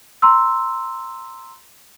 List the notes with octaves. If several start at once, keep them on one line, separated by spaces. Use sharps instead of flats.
A#5 C6 E6